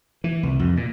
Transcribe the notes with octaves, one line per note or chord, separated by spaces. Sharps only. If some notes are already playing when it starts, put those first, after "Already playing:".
E3
C2
F2
A#2